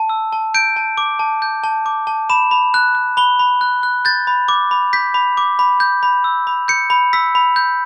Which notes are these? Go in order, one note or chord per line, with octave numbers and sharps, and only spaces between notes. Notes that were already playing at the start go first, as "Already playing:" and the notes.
Already playing: A5
E6
A5
G6 D7
A5
D6
A5
G6
A5
D6
A5
B5 E7
B5
F#6
F#6
B5 G7
B5
F#6
F#6
G6 A6
B5
D6
B5
G6 B6
B5
D6
B5
G6
B5
E6
B5
G6 C#7
B5
E6 B6
B5
G6